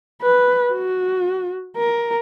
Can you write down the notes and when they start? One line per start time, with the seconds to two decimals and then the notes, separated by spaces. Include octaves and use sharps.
0.22 B4
0.72 F#4
1.77 A#4